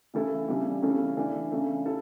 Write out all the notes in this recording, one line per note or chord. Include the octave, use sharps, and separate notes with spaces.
C#3 E3 A3 E4 A4
C#3 E3 G3 D4 G4
C#3 E3 A3 C#4
E3 A3 D4
C#3 E3 A3
E4 A4